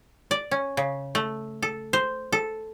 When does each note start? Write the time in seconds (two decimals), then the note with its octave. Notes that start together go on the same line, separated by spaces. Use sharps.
0.31 D5
0.51 C#4
0.77 C#3
1.15 A3
1.62 A4
1.93 C5
2.32 A4